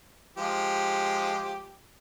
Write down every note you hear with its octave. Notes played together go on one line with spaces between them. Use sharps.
F3 G#3 G4